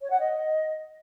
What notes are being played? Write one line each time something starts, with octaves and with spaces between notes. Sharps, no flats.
C#5
F#5
D#5